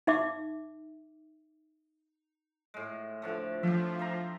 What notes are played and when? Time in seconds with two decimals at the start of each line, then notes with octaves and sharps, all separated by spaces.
0.07 D#4 E5 D6
2.74 A2 G#3
3.22 D3 F3 A3
3.63 F3 G4 E5
3.99 C5 E5 A#5